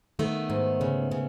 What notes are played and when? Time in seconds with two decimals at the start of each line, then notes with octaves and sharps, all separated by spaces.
0.19 D#3 A3 B3
0.50 G#2
0.81 C#3
1.11 C#3